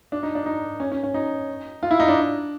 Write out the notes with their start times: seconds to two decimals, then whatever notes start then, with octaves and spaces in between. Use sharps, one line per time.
0.12 D4
0.23 D#4
0.35 D4
0.46 D#4
0.80 C#4
0.92 C#4
1.03 C#4
1.14 D#4
1.83 F4
1.91 E4
2.00 D#4
2.08 D4